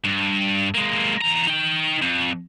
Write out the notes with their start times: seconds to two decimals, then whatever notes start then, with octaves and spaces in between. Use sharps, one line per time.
0.05 G2
0.74 G#3 A#3
1.21 E2 A#5
1.47 D#4 G5
2.02 F2